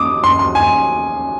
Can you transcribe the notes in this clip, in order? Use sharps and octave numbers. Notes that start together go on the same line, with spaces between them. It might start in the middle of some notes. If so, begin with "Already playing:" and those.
Already playing: D6 D#6
C6
C6
G#5